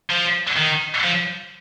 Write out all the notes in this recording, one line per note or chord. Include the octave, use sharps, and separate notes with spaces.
F3
D#3
F3